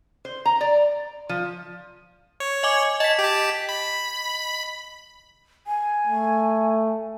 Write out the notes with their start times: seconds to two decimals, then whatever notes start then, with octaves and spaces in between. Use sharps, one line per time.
0.25 C5
0.46 A#5
0.61 D5
1.29 F3
2.40 C#5
2.63 D#5 G#5 D6
3.00 D#5 A5 B6
3.19 G4 A5
3.69 B5
5.67 G#5
6.07 A3